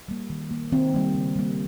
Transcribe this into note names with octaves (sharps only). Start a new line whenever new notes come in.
G3 A#3
D#3
A#3
D#3 C4
G3 A#3
C#3
G3 A#3